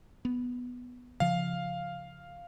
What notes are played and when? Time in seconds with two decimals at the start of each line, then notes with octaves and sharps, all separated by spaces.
0.25 B3
1.20 C#3 F3 F5